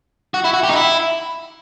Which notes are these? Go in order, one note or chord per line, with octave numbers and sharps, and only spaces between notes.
F#4
E4
F#4
G4
D#4
E4